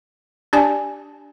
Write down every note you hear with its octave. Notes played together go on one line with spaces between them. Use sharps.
D4 G4 D5 G#5 A5